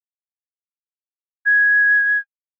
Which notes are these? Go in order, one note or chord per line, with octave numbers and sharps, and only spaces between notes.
G#6